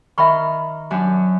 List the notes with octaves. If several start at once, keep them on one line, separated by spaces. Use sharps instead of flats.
D#3 E5 B5 C#6 F6
F#2 F#3 D4